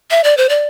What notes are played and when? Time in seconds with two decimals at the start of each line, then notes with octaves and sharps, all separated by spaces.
0.11 E5
0.24 D5
0.37 C5
0.49 D5